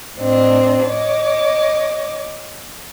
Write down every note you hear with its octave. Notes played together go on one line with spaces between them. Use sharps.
A2 C4 D4 D#5
C#5 D#5 D6